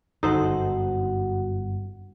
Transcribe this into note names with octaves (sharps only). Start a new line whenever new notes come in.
G1 F#2 D#4 F#4 A4 C5 F#5